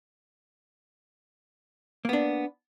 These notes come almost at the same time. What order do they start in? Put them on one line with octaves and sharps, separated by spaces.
A#3 B3 D4